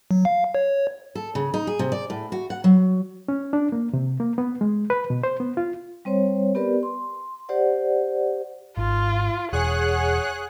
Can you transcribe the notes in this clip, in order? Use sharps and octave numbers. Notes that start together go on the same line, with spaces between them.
F#3
F5
C#5
A4
C#3
D#4
G#4
C3
D5
A2
F#4
F#5
F#3
C#4
D4
A#3
C3
A#3
B3
G#3
B4
B2
C5
B3
F4
G3 C4 C5 C#5
B3 G4 A#4 B4 D5
C6
G4 C5 D5 F#5
G#1 F4
E1 G#4 C#5 F#5 F#6